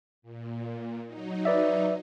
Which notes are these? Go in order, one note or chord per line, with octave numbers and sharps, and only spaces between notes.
A#2
F#3 D#4
B4 D5 E5